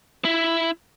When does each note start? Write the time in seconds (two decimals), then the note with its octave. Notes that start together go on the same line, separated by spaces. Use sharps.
0.25 E4